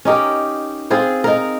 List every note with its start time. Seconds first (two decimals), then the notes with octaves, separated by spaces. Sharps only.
0.05 C#4 D#4 G4 A#4
0.90 C4 F4 G#4 C5
1.24 D#4 A#4